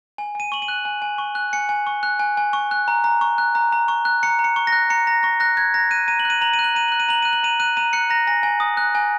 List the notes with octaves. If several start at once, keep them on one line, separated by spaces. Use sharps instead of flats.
G#5
G#5 D#7
C#6 F#7
D#7
F#6
G#5
G#5
C#6
F#6
G#5 C#7
G#5
C#6
F#6
G#5
G#5
C#6
F#6
A#5
A#5
C#6
F#6
A#5
A#5
C#6
F#6
A#5 C#7
A#5
C#7
C#6
A#6
F#6
A#5 C#7
A#5 A#6
C#6 A#6
F#6 A#6
F#6 G#6
A#5 A#6
F#6 D#7
A#5 D#7
F#7
F#6
D#7
A#5 F#7
D#7
F#6
F#7
A#5 D#7
F#6 F#7
D#7
A#5 F#7
F#6 D#7
F#7
A#5 D#7
F#6 D#7
A#5 D#7
F#6 C#7
A#5 A#6
G#5 A#6
G#5
D#6
F#6
G#5